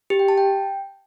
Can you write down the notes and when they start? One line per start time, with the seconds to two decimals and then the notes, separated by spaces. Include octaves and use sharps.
0.10 G4
0.19 G5
0.28 A5
0.38 G5